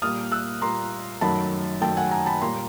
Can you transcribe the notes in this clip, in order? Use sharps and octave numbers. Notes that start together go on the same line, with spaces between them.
A#2 G3 A#3 D#6 F6
E6 F#6
A#2 G3 A#3 A#5 C6
F#2 D#3 F#3 A3 A5 B5
F#2 D#3 F#3 A3 G5 A5
F#5 G#5
G#5 A#5
A5 B5
A#2 G3 A#3 A#5 C6